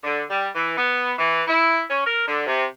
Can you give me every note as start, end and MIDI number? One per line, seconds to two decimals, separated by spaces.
0.03 0.22 50
0.29 0.47 55
0.54 0.75 52
0.76 1.13 59
1.17 1.42 52
1.47 1.81 64
1.89 2.03 61
2.05 2.23 70
2.26 2.43 50
2.46 2.64 48